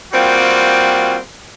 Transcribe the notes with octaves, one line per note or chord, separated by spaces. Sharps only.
G3 A#3 C4 F4 F#4